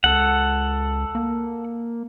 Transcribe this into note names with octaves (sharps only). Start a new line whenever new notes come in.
C#2 A4 F#5
A#3